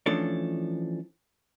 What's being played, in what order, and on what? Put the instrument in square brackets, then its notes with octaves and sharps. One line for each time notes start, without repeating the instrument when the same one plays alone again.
[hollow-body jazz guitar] E3 F3 A3 C#4 D4